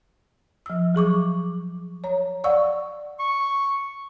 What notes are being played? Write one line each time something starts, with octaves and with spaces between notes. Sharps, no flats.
F3 E6
F#3 G#4 C#6 D6
C#5 A#5
D5 F5 F#5 C#6 E6
C#6